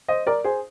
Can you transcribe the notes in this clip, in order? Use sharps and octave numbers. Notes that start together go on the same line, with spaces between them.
C5 D#5
A#4 D5
G#4 C5